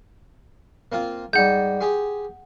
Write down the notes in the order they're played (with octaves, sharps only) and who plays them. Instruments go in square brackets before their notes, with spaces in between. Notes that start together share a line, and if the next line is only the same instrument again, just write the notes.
[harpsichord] A#3 C4 F4
[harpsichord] G#2 G3 [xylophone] F#5 G6
[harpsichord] G4 G#4 C6